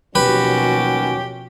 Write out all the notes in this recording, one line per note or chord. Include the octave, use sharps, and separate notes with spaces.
D#2 B2 F3 F#3 C#4 F#4 G4 B4